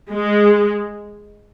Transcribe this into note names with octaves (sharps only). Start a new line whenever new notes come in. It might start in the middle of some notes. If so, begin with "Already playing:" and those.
G#3